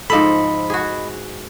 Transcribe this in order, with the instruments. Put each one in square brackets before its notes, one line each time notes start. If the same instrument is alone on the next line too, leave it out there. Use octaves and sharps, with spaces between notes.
[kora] G#2 F3 A4 [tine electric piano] D#5 B5
[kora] F#4 G#4